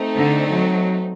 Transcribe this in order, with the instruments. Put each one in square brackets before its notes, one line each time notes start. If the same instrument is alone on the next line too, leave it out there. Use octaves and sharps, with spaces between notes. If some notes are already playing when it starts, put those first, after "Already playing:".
Already playing: [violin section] A3 C4 D#4
[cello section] D3
F#3